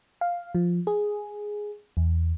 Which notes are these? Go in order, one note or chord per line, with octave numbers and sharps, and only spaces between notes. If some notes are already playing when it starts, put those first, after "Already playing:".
F5
F3
G#4
E2